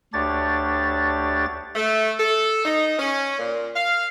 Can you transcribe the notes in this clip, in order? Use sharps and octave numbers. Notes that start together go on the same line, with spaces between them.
D2 D4 G4 C#5 A6
A3
A4
D#4
C#4
A#2
F5